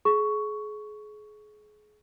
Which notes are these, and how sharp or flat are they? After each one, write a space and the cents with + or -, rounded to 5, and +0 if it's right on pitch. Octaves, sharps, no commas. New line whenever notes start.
G#4 +30 C#6 +10